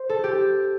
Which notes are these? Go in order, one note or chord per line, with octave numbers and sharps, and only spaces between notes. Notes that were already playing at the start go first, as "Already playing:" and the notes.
Already playing: C5
A4
G4